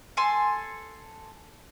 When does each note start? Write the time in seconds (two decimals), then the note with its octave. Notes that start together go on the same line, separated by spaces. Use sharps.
0.17 A4 G#5 C6